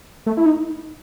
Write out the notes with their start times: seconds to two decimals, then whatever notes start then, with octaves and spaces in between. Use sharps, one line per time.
0.26 A3
0.37 E4
0.46 D#4